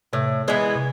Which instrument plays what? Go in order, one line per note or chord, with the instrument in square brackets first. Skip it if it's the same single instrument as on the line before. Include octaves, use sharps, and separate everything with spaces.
[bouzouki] A2 [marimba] C3
[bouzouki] E3 G#3 B3
[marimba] C3